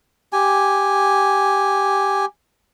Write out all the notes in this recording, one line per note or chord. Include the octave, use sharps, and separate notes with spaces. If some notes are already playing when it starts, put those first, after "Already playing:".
G4 G#5